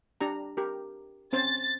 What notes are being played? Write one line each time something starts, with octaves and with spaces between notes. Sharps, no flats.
D4 G4 A#5
G4 A#4
C4 C#4 C5 A6